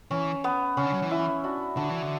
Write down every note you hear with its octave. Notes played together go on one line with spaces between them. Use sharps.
E3 C#4
B3
C#3 C#4
D3
F#3
E3
E4
D4 F#4
D3 D4 F#4
E3
D3